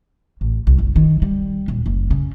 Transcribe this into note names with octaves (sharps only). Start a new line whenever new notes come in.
A1
C2
F#1
D#3
G3
D#1
F#1
C#3